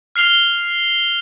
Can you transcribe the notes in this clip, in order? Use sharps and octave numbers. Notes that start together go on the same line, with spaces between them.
F6 C7 F7 G7